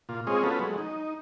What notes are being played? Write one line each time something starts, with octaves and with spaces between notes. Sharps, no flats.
A#2 F4
G#3 C4 F4 G#4 C#5 D#5
B3 C#4 F4 F#4 A4 B4
F#3 G#3
D#4